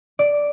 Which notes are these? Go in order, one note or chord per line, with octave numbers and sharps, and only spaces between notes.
D5